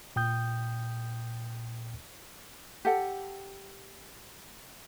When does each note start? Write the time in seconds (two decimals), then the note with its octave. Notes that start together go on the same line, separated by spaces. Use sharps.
0.16 A#2 G5 D#6 G6
2.85 G4 A4 F#5